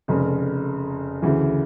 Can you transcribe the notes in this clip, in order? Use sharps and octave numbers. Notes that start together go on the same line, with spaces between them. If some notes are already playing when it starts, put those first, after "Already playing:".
F1 F2 C#3
D2 C#3 E3